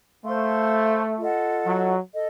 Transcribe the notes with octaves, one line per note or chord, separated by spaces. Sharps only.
A3 C5 F5 C6
F4 A4 D#5 F#5
F#3
A4 D#5